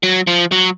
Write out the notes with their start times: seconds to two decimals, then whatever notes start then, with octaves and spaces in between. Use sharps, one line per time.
0.03 F#3
0.27 F3
0.52 F#3